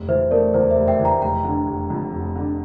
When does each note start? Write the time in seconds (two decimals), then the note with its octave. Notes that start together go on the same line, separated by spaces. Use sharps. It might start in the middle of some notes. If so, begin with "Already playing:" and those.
Already playing: F1
0.08 E3 C5 E5
0.31 A3 A#4 D5
0.54 E2 C5
0.70 C5 E5
0.77 F1
0.88 E5 G5
0.99 E3
1.05 G5 A#5
1.22 F1 G5 A#5
1.45 D3
1.67 F1
1.90 F2
2.13 F1
2.36 D3